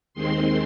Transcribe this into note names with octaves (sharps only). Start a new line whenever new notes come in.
D#2 D#3 G#3 C4 C6